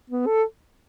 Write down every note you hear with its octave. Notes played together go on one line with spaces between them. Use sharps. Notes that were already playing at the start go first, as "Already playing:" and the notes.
B3
A4